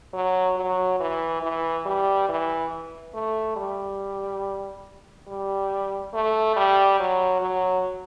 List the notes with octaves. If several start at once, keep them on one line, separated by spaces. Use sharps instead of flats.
F#3
F#3
E3
E3
G3
E3
A3
G3
G3
A3
G3
F#3
F#3